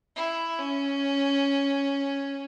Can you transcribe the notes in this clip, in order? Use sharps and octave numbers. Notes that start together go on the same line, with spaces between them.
E4
C#4